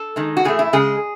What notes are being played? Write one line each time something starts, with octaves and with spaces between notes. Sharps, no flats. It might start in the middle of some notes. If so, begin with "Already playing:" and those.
Already playing: A4
D#3 G#3
F#4
A2 E3 A3 G#4
E4
C#3 G#3 G#4